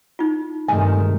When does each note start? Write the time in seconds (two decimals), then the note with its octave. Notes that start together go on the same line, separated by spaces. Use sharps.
0.19 D#4 F4
0.68 G2 C3 D#3 G#3 A3 G#5